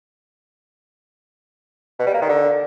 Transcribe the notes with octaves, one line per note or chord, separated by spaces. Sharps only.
B2
G3
A#3
D#3
D3